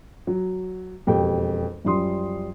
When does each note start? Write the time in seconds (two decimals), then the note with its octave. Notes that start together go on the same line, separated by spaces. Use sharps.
0.27 F#3
1.07 E1 F2 G4 G5
1.85 F#2 F3 G3 C6 D#6